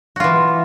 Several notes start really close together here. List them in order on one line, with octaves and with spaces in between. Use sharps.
F#4 F4 E3